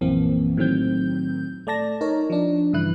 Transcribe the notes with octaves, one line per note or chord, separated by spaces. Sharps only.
A#1 F#2 E3 A#3 C4
A2 D#3 F#3 C4 G6
A3 D5 A5 A#6
D#4 A#4 C#5
F3 D4
G2 C#3 E3 E4 F#6